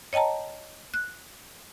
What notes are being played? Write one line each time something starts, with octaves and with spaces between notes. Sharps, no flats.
C#5 D#5 G5 A5 A#5
F#6